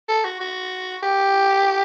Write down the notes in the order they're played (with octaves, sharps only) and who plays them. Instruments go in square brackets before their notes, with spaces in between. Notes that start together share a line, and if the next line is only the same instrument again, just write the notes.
[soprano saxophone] A4
F#4
F#4
G4